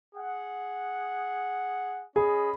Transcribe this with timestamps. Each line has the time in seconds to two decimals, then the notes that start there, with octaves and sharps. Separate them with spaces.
0.15 G#4 F#5
2.16 C#4 G#4 D#5 B5